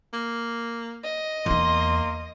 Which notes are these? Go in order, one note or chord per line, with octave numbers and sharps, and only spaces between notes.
A#3
D#5
E2 A#3 D#4 C6